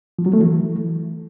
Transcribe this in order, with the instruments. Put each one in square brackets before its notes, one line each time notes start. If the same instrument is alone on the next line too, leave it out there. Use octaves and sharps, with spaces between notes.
[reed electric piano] F3
F#3
A3
E3